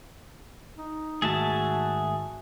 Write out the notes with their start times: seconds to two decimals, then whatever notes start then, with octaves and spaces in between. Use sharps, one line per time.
0.78 D#4
1.22 G#2 D#3 A3 F#4 G#4 E5 A5